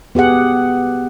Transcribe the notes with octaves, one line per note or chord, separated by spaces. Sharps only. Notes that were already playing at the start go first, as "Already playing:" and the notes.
B3 G4 G#4 F#5